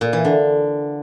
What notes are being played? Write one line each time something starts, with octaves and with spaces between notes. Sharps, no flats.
A#2
E3
D3